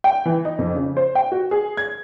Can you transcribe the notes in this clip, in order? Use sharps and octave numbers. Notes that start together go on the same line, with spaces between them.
G5
E3
D#4
F2
C#3
C5
G5
F#4
G#4
G#6